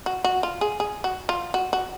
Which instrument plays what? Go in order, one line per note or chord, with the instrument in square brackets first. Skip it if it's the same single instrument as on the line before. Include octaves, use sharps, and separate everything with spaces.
[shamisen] F#4
F#4
F4
G#4
G#4
F#4
F4
F#4
F#4